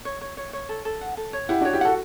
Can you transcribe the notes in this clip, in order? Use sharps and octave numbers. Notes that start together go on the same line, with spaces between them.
C#5
C#5
C#5
C#5
A4
A4
F#5
A4
C#5
E4 G4 F#5
D4 F#4 C#5
E4 G4
F#4 A4 F#5